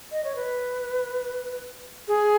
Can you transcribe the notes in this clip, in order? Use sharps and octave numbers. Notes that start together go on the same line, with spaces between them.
D#5
C#5
B4
G#4